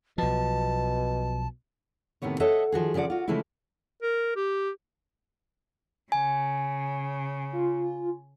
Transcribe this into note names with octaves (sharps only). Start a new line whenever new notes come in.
B1 B2 F3 A5
A2 C3 D#3 B3 C#5
A4 C#5 D#5 E5 F#5
D#3 F3 F#4 G#4
C#3 F3 G#4 D5 F#5
F4 F#4
C#3 E3 F3 G#3 A3 E4
A#4
G4
C#3 G#5
F4